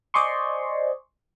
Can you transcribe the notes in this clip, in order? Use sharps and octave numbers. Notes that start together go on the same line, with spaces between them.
C5 D5 D#5 G#5 C6 C#6